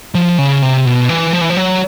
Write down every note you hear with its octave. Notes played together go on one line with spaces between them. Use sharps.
F3
C#3
C3
B2
E3
F3
E3
F3
F#3